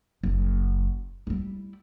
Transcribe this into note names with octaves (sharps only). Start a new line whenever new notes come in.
F#1
G3 E4